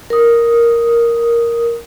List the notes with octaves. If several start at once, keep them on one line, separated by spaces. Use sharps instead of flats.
A#4 D#6